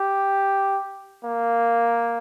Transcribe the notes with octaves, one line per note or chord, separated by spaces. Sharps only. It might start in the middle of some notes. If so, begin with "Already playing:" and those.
Already playing: G4
A#3